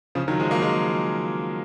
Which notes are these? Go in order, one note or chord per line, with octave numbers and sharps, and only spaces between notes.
C#3 F3
D#3 F#3
F3 G#3
F#3 A#3
F3 G#3